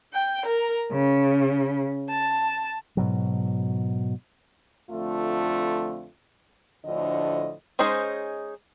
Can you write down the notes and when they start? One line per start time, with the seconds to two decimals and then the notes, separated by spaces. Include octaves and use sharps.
0.14 G5
0.46 A#4
0.89 C#3
2.11 A5
2.97 G#2 B2 F#3
4.89 F2 D3 A3 F4
6.84 D2 A2 D3 F3 D#5
7.79 G#3 C#4 D#4 G#4 C5